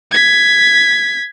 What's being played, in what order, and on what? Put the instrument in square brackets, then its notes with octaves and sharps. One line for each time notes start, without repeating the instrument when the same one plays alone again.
[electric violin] G#6 B6